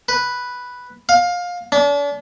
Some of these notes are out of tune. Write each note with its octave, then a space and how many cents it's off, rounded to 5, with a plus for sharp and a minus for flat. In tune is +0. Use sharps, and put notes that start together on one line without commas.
B4 +0
F5 +20
D4 -40